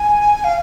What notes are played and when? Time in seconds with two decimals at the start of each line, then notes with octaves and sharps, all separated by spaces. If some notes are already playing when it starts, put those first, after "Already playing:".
Already playing: G#5
0.44 F5